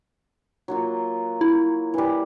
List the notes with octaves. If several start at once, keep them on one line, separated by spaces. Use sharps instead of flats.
F#3 A#3 F4
E4
E3 G3